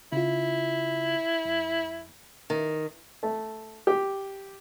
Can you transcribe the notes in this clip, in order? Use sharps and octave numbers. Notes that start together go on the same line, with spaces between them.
C#3 E4 F4
F2
D#3
A3
G4